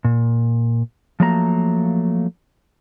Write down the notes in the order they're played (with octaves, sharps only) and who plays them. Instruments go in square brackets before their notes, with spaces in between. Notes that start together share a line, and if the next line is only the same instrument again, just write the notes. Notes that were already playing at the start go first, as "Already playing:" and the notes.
[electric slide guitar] A#2
F3 F#3 A3 A#3 D5 A#5